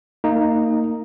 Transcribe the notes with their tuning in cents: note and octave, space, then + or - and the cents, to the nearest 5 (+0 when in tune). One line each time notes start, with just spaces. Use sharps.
A#3 -25 D#4 +0